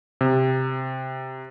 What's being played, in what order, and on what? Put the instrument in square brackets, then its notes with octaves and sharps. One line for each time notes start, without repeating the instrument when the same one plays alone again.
[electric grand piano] C3